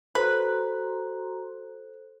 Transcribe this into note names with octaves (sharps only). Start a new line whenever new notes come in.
F#4 A4 B4 C5 A#5 C6 F#6